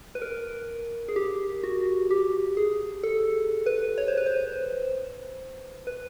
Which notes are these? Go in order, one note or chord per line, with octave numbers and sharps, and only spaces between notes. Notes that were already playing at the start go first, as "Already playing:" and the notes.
B4
A#4
G#4
G4
F#4
G4
G#4
A4
B4
C#5
C5
B4
C5
B4